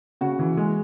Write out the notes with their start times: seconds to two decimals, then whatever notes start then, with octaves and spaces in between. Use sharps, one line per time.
0.21 C#3 F#4
0.39 E3
0.57 G#3